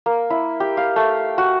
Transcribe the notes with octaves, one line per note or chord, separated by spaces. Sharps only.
A#3
E4
G4
F5
A3
F#4